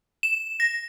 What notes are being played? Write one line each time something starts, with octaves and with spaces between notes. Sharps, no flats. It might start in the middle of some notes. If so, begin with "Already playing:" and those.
E7
A#6